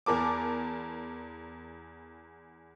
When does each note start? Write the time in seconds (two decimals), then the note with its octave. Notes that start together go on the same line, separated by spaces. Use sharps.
0.06 E2 A#4 A5 D6